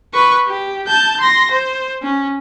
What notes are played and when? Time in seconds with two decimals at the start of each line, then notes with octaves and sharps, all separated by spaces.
0.14 B4 C#6
0.48 G4
0.87 A5 G6
1.20 C6 A#6
1.51 C5
2.02 C#4